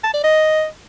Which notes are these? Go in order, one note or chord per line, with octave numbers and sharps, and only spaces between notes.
A5
D5
D#5